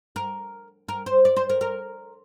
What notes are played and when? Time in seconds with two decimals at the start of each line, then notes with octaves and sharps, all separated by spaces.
0.16 A#4
0.89 A#4
1.06 C5
1.25 D5
1.37 C5
1.50 A#4
1.61 A#4